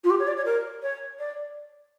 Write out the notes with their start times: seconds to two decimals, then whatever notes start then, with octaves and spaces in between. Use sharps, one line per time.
0.04 F4
0.10 G4
0.19 C#5
0.27 D5
0.36 C#5
0.45 A#4
0.82 C#5
1.19 D5